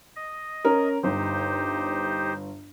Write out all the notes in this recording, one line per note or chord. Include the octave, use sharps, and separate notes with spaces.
D#5
C#4 A#4
G1 D#4 G4 C5